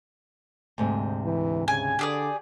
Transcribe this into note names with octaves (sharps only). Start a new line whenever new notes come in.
D2 G#2 C3
E3
C#3 G#5
D3 G4 G#4 D5